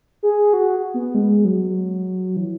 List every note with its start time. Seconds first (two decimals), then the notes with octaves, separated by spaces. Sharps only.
0.23 G#4
0.53 F#4
0.94 B3
1.15 G#3
1.45 F#3
2.36 E3